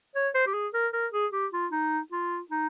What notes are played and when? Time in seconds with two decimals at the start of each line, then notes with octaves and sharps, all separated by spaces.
0.15 C#5
0.34 C5
0.47 G4
0.54 G#4
0.74 A#4
0.93 A#4
1.13 G#4
1.32 G4
1.53 F4
1.71 D#4
2.12 F4
2.50 D#4